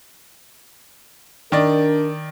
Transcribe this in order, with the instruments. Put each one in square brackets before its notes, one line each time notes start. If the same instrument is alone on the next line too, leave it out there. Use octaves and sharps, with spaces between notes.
[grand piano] D#3 D5 [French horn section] D4 A#4